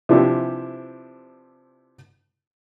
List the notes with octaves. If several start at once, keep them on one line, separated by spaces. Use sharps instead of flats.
C3 E3 F3 D4 E4 G4